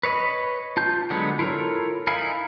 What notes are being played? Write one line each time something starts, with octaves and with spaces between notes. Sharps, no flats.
B4 C#5 D#5 B5
F4 A5 G6
D3 F#3 G#3 B3
E4 F4 A4 A#4 C#5
D#4 E4 F5 G#5 B5